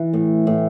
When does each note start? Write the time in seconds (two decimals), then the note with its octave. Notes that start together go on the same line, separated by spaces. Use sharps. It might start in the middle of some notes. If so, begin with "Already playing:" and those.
Already playing: E3
0.13 A2
0.47 A2